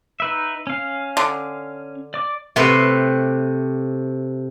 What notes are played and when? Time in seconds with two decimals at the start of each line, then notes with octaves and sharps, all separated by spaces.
0.20 D#4 B4 E5
0.67 C#4 F5
1.17 D3
2.14 D5 D6
2.56 C3 A3 G4 B4 E5 C6